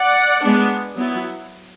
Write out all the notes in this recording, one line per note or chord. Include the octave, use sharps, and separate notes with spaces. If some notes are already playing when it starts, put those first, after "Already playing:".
Already playing: D5 F#5
G#3 B3 D4
F#3 B3 E4